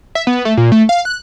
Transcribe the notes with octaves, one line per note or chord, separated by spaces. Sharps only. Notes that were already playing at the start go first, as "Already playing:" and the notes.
E5
B3
A3
A#2
A3
F5
F#6